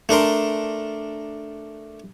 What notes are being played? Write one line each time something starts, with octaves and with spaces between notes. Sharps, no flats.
A3 D4 A#4 C6